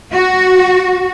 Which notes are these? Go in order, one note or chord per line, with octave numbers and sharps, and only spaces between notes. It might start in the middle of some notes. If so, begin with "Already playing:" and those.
F#4